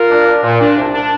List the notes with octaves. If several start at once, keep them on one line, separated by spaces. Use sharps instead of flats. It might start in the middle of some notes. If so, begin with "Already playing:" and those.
Already playing: F4 A#4
D4
D4
A#2
D4
C2
D4